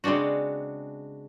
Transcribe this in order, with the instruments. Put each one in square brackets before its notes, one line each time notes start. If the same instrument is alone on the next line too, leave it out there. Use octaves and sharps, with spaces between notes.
[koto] C#3 G#3 C4 D4 F#4